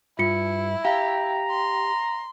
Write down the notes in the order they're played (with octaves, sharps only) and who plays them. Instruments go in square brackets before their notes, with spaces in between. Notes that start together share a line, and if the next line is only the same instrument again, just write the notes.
[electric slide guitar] G2 [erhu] E4 [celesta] F4 C#7
[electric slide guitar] G4 [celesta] F5 [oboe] A#5
[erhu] C6